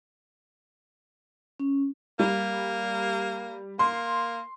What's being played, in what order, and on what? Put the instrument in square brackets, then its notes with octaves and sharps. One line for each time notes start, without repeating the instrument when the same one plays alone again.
[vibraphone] C#4
[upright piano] G3 [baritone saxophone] A#3
[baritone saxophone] A#3 [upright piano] C6